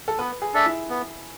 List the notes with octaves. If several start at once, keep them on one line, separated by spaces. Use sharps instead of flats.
A4
B3 B4
G#4
D4 A4 E5
E4
B3